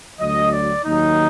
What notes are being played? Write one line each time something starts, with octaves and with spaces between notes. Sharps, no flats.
D2 D3 F#3 D#5
D5
D#2 D#3 F#3 D#4